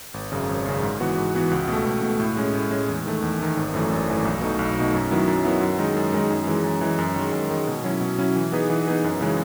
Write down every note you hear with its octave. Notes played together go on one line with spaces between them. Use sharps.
G#1
F#2 C#3
G#1
F#2 C#3
G#2
E3 B3 F#4
G#2
E3 B3 F#4
C#2
B2 A3
C#2
B2 A3
A2
G#3 C#4
A2
G#3 C#4
E2
D#3 A3
E2
D#3 A3
G#1
F#2 E3 A3
G#1
F#2 E3 A3
B1
B2 A3 D#4
B1
B2 A3 D#4
F#2
D#3 F#3 B3 E4
F#2
D#3 F#3 B3 E4
F#2
D#3 G#3 D#4
F#2
D#3 G#3 D#4
F#2
E3 G#3
F#2
E3 G#3
F#2
D#3 G#3
F#2
D#3 G#3
B2
F#3 C#4 E4
B2
F#3 C#4 E4
E3
B3 D#4 G#4 B4
E3
B3 D#4 G#4 B4
F#2
C#3 E3 G#3